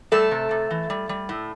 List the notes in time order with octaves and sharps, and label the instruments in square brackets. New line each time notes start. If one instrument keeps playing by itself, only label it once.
[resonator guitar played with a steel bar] G3 A3 A4
C3
C3
E3
G3
G3
A2